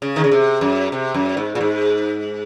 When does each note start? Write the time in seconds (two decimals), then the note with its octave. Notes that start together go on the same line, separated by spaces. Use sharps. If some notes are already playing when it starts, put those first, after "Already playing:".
0.02 C#3
0.16 D#3
0.24 C#3
0.32 C3
0.61 F#2
0.92 C3
1.14 F#2
1.37 G#2
1.55 A#2
1.61 G#2